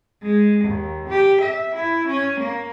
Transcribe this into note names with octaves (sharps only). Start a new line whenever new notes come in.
G#3
D#2
G4
E5
E4
C#4
A#3